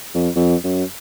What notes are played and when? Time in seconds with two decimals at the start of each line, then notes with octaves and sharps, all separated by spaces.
0.15 F2
0.36 F2
0.64 F#2